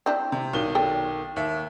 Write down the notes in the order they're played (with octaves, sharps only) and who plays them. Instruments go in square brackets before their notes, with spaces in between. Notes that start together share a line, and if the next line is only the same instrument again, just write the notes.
[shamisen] C4 D4 E4
[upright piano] C3
B1 D#3 G7
[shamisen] A4 D5 G5
[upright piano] D#2 E5